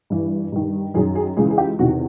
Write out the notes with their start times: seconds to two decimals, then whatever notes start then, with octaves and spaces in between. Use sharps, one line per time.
0.10 G2 E3
0.52 G2 D#3
0.94 F#2 D#3 G#4
1.15 G#4
1.37 C#2 C#3 E3 G#4
1.50 G#4
1.58 G4
1.79 E2 C3 D#3 F#4